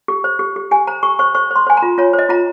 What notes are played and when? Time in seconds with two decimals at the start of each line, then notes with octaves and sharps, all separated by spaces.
0.08 G4
0.24 C5
0.39 G4
0.56 G4
0.71 G4 G#5
0.87 C5 A#5
1.03 G4 C#6
1.19 C5 C#6
1.35 C5 C#6
1.51 C5 C6
1.67 C5 G#5
1.77 A#5
1.82 F4
1.98 F4 C#5
2.13 C5
2.19 D#5
2.29 F4 A#5